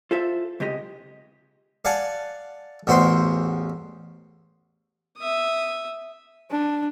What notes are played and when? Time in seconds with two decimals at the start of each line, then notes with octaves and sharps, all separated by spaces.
0.11 F4 A4 C5 E5 F5
0.60 C#2 C3 G#3 G4 D#5
1.85 D5 F5 F#5 G#5 A5
2.87 A1 E2 F#4 C5 G5 C6
5.18 E5 D#6
6.51 D4